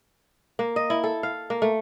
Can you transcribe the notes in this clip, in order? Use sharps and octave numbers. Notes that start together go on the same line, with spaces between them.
A#3
D#5
E4
A4
F5
A#3
A3